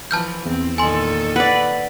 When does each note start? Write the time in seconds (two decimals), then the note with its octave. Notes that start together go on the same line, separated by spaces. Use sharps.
0.11 E3 F3 A5 F6 G6
0.46 E2 C4
0.78 A#2 D#3 A4 G#5 C6
1.36 B4 D5 F#5